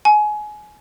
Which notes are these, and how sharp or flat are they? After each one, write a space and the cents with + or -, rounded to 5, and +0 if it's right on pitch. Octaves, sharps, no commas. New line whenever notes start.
G#5 +25